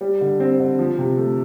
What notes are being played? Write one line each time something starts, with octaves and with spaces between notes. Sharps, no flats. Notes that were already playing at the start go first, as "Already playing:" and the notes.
G3
D3
C4
D3
F3
C3
A3